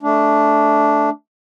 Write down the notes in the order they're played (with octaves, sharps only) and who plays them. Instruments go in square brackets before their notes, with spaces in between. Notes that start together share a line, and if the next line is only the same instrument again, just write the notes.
[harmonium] A3 D4